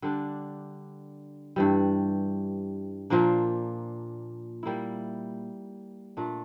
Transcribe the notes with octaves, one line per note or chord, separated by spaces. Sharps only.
D3 G3 D4
G2 E3 G3
A#2 F3 A#3 D4
G3 A#3 E4
A#2 A3 D4